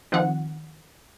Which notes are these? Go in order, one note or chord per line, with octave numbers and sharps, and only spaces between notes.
D#3 F3 C4 F4 F#5